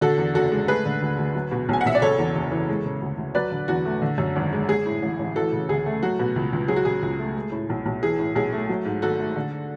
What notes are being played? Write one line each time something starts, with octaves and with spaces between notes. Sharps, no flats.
D3 F#4 A4
E2
F#1 F#4 A4
G#3
A3 G#4 B4
D3
D2
D2
F#3
B2
B1 G#5
F#5
B1 E5
D5
C#3 A4 C#5
E2
F#1
E3
G#3
C#3
D2
D2
F#3 B4 D5
D3
E2 F#4
A3
D3
F#2
G#1
G#3
G#3 G#4
A2
A1
A1
E3 F#4 A4
C#3
D2 G#4
A3
F#3 F#4
B2
C#2
C#2
F#3 G#4
F#4
C#3 G#4
C#2
A3
G#3
A2
B1
B1
E3 G#4
A2
B1 G#4
A3
F#3
G#2
G#1 F#4 A4
A3
D3